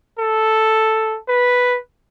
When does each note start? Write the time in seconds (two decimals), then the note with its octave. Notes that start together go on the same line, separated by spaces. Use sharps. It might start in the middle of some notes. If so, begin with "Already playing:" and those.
0.19 A4
1.28 B4